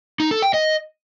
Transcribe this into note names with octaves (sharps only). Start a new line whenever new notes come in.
D#4
A4
G5
D#5